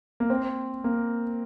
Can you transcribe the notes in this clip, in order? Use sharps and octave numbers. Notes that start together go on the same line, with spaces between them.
A#3
C4
A#3